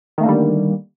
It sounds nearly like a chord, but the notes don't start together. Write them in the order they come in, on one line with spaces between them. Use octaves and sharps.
D#3 A3 A#3 D3 G3